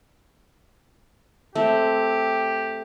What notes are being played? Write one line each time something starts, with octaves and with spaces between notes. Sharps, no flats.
A3 C4 G4